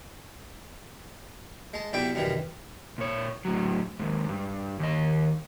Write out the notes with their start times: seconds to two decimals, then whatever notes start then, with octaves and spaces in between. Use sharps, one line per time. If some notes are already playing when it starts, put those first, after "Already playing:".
1.74 G#3 A5
1.93 B1 C3 E4 D5 E5 G5
2.15 C2 F#2 D#3 E3 G3
2.98 A#2 C#5
3.45 A2 F#3
4.00 D#2 G#2
4.29 G2
4.79 D#2 D#5